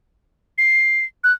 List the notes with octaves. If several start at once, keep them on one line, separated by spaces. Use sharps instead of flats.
C7
F#6